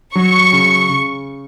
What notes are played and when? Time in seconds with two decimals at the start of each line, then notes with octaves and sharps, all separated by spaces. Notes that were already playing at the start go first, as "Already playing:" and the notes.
0.15 F#3 C#6
0.53 C#3
0.89 C#3